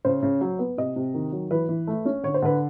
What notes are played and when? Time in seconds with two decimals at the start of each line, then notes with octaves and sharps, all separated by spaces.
0.05 C#3 C5
0.23 C#3
0.41 F#3
0.59 B3
0.78 C3 D#5
0.96 C3
1.14 D#3
1.32 F#3
1.51 E3 B4
1.69 E3
1.87 A3
2.05 C#4
2.23 D3 C#5
2.34 C5
2.42 D3 B4